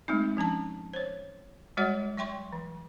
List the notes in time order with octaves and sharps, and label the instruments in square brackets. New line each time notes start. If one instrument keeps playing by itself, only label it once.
[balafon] G#3 A3 C4 D#4
F3 C#4 D4 A5
C5 C#5
G3 G#3 F#4 C#5 E5 F#5
F#3 E5 G5 C6 C#6
E3